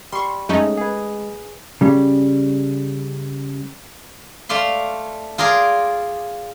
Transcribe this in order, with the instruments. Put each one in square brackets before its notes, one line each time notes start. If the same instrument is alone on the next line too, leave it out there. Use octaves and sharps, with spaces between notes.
[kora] G3 [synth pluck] C6 C#6
[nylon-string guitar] G#3 [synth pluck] A3 C#4 D#4
[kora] G#4 B4
[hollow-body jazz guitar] C#3 G3
[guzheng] A3 D5 F5 C6
F4 G#4 A#4 D5